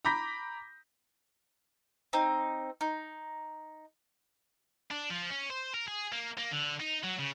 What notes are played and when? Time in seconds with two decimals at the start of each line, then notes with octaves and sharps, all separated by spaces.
0.05 A#5 B5 D6 G6 A#6 B6
2.13 C4 D#4
2.81 D#4
4.91 D4
5.10 F3
5.30 C#4
5.50 C5
5.74 A#4
5.88 G#4
6.12 A#3
6.38 A#3
6.51 D3
6.80 D#4
7.04 F#3
7.19 C#3